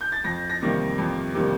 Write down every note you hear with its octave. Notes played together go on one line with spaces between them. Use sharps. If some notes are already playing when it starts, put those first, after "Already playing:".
G6
A6
F2 A#6
A#6
C3 D#3 G3 A#3
F2
C3 D#3 G3 A#3